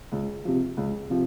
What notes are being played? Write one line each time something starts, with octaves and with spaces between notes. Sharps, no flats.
C#2
C3 F3
C#2
C3 F3